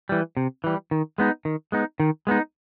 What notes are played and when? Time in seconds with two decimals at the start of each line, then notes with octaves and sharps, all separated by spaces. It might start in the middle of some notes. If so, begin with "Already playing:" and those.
0.09 E3 G3
0.37 C3
0.64 E3 G3
0.91 D#3
1.18 G#3 B3 D#4
1.45 D#3
1.72 G#3 B3 D#4
2.00 D#3
2.27 G#3 B3 D#4